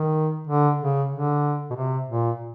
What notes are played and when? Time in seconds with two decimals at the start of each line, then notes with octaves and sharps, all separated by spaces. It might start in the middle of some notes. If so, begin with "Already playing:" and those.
Already playing: D#3
0.47 D3
0.80 C#3
1.11 D3
1.70 B2
1.75 C3
2.08 A#2